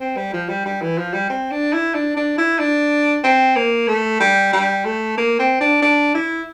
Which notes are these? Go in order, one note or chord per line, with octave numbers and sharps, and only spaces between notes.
C4
G3
F3
G3
G3
E3
F3
G3
C4
D4
E4
D4
D4
E4
D4
C4
A#3
A3
G3
G3
A3
A#3
C4
D4
D4
E4